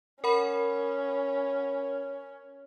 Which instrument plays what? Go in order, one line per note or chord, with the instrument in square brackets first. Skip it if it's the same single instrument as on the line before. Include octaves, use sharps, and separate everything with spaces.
[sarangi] C#4 [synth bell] A#4 F#5 B5